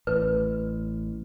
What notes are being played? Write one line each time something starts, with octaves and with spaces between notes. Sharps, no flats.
A1 B4